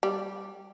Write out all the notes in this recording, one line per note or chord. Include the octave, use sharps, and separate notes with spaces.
G3